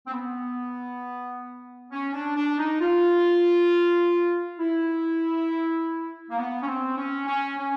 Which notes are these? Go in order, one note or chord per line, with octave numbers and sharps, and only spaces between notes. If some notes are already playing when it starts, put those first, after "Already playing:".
C4
B3
C#4
D4
D4
D#4
F4
E4
A#3
B3
C#4
C4
C#4
C#4
C#4